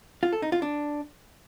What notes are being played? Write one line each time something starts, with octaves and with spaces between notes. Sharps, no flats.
F4
A4
D#4
F4
D4